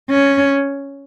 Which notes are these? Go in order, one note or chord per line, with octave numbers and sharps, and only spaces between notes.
C#4